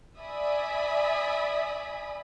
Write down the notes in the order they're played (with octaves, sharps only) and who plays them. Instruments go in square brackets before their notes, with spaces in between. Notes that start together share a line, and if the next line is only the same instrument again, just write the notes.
[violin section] D5 E5 G#5 B5 D#6